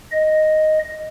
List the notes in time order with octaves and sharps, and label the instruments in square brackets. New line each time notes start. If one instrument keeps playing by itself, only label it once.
[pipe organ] D#5